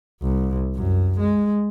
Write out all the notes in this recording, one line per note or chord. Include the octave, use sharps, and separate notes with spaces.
C2
F#2
G#3